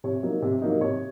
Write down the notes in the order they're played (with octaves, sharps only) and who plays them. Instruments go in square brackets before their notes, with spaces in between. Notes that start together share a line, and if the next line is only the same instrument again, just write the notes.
[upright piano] C3 C#5
F#3 A#3 D#4
C3
F#3 A#3 D#4
C3 C#5